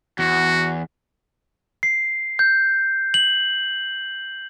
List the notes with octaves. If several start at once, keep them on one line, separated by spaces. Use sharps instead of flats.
E2 F#4
C7
G6
F#7